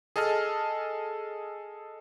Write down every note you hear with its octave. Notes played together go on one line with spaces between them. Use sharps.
G#4 A4 D#5 A5 F6